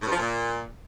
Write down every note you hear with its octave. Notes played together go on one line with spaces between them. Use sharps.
A2
G2
F3
A#2